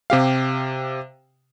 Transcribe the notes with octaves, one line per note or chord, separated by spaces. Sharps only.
C3 G4 F5